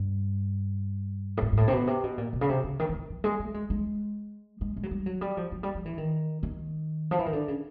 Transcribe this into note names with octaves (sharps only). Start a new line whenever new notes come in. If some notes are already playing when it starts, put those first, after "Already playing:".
Already playing: G2
A2
G#2
G#2
A2
C3
B2
C3
B2
A#2
B2
C#3
C3
C#3
D#3
F3
E3
F3
G#3
A3
G#3
G#3
G#3
G#3
F#3
G3
F#3
G3
F3
F#3
G3
F3
E3
D#3
D#3
F3
E3
D#3
D3
C#3